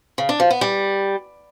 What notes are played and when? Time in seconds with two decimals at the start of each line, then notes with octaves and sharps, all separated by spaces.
0.18 C#3
0.29 D4
0.40 F3
0.50 B3
0.61 G3